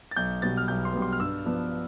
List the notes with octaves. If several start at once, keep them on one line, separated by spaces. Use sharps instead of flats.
A6
B1 G6
B2 G3 B3 A6
F6
B1 G6
C6
B2 G3 B3
C6
F6
G2 E6
F3 B3 D4